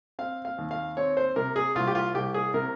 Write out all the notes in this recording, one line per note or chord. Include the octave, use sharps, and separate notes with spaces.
C4 F5
F5
D#2
F5
C4 C#5
C5
C3 A#4
G#4
C2 F4
G4
F4
C2 G4
G#4
C3 A#4